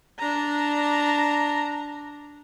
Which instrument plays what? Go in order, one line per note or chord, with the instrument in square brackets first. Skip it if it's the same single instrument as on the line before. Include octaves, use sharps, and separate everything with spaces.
[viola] D4 A#5